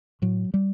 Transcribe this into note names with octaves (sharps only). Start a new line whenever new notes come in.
A2 F#3
G3